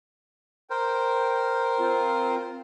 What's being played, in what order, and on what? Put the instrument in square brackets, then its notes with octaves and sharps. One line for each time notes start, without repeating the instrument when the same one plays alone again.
[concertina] A#4 C5 [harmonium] G5
[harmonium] C4 F4